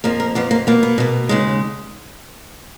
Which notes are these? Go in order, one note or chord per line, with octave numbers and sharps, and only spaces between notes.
F2 F3 A#3 A#4
A#4
F2 F3 A#3 B3
A#3
B2 A#3 B3
B3
B2 A#3
D#2 C#3 G#3